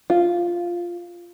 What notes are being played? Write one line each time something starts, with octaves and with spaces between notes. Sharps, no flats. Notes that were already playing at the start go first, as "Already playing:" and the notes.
F4